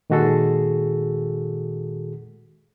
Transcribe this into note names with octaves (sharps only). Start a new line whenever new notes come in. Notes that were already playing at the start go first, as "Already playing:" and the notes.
A#2 D#3 G#3 F#4 G#4 A4